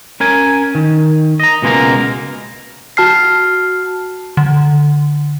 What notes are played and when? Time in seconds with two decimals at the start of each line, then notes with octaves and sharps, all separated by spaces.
0.20 C#4 A#4 G#5
0.75 D#3
1.40 D#5 A#5
1.62 C#2 B2 G#3 A#3 A#4 A#5
2.97 F#4 A5 F6 C7
4.37 D3